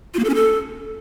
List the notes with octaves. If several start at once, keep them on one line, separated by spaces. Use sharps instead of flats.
F4
A#3
A4
C#4
A4